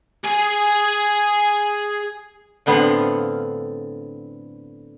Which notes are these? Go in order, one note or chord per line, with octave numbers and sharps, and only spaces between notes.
G#4 G#5
A2 D3 B3 C4 F5